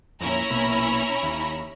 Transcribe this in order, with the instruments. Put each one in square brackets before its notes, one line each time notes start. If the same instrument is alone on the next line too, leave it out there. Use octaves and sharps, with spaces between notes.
[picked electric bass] F2 A#2 [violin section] C#4 E4 A#5
[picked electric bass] A#1 B2 A#3 [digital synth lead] B5
[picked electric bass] D#2